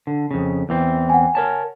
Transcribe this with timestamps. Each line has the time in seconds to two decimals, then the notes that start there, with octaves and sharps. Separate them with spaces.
0.07 D3
0.31 F2 C#3
0.69 E2 E3 C4
1.09 F#5 G#5
1.35 A#4 C#5 A5